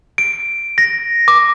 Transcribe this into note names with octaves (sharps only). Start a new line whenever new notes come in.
D7
A#6
D6